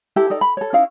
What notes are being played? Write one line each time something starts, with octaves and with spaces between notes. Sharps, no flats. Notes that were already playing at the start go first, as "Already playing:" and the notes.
E4 G4 A4 A5
D#4 A4 D5
B5
A4 C#5
C#4 D#4 E4 F5